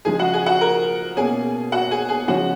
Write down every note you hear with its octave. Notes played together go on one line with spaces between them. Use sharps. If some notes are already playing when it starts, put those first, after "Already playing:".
C#3 F3 G#3 G#4 G#5
F#4 F#5
G#4 G#5
F#4 F#5
A#4
B2 A#3 C#4 G#4 G#5
F#4 F#5
G#4 G#5
G#4 G#5
C#3 F3 G#3 C#4 F#4 F#5